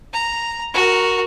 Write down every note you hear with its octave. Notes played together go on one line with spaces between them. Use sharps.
A#5
F#4 A#4